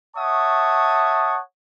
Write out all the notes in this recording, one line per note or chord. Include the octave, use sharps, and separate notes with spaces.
C#5 E5 F#5 A5 C#6 D#6